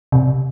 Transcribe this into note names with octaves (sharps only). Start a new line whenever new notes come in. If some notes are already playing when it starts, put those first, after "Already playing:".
C3